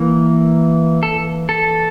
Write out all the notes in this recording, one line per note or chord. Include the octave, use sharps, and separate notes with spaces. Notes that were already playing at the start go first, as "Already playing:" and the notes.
Already playing: E3 A#3
A4
A4